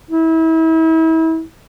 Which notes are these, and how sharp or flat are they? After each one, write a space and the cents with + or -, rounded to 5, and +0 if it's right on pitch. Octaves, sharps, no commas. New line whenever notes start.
E4 -35